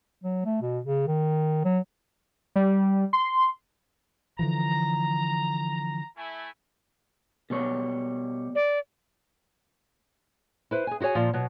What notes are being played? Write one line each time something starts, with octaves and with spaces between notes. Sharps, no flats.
F#3
A3
B2
C#3
D#3
F#3
G3
C6
D3 E3 F3 A#5
A3 E4 G#5
B2 G3 C#5
D5
E4 B4 C5
G#4 G#5
E4 F#4 G#4 C#5 G#5
A#2 F3
B2 F#3